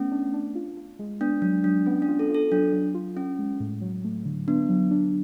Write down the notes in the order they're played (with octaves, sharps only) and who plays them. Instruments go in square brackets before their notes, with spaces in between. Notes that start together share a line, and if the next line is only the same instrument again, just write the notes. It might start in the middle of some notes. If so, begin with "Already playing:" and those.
Already playing: [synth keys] A3 B3 [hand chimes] C#4
[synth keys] D4
D4
F4
F4
G#3
[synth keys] B3 [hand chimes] D4
[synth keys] F#3 [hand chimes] D4
[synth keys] F#3 [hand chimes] D4
[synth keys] B3 [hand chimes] C#4
[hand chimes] D4
[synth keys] F4
[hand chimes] A4
[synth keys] F4 [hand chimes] A4
[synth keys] F#3 [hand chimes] D4
[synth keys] F#3
F4
[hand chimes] C#4 [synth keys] F4
[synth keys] G#3
A2
F#3
A3
D3
[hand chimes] B3 [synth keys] D4
[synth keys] F#3
D4